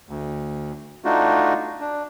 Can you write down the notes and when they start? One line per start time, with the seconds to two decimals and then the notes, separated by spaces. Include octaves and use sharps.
0.09 D2
1.05 A3 D4 D#4 F4 F#4
1.81 D4